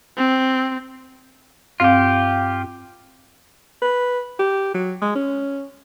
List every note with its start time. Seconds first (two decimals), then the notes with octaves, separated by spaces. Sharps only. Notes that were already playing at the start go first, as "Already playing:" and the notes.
0.18 C4
1.80 G2 C4 F4 G4 F5
3.82 B4
4.39 G4
4.74 F#3
5.02 G#3
5.15 C#4